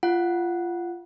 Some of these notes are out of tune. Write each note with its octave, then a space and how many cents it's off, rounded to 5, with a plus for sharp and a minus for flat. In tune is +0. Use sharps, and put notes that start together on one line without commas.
F4 -20 F#5 +0